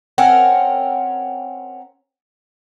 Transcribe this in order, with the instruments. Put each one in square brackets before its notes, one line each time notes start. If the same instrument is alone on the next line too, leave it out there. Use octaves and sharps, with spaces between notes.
[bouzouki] C4 C#4 A#4 F#5